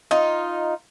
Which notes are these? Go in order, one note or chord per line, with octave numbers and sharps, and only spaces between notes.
D#4 F4